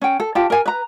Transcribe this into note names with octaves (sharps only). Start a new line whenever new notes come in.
C#4 G5
A4
F4 G4 A5
A#4 G#5
B4 A#5